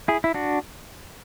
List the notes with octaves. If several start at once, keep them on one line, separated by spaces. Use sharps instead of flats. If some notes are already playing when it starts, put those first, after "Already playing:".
E4 G#4
E4
D4 F#4